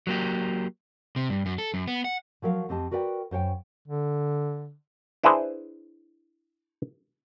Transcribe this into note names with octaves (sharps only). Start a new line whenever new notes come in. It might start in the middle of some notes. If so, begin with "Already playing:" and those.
F#3 A#3 G4
C3
G2
F#2
A4
F#2
B3
F#5
F3 F#3 A#4 E5 F5
F2 C4 G4 D#5 A5
F#4 A#4 B4 D5 G5
F#2 C5 C#5 G5
D3
D4 E4 G#4 B4 C5